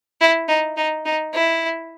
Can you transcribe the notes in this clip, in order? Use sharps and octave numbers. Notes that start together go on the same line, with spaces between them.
E4
D#4
D#4
D#4
E4